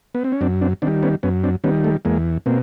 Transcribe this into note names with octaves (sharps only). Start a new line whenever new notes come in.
B3
C4
C#4
F#2 C4 D4
C4 D4
D#3 G3 C4 D4
B3 C#4
F#2 B3 C#4
C4 D4
D#3 G3 B3 C#4
A3
E2 G#3 A#3
B2 A#3 C4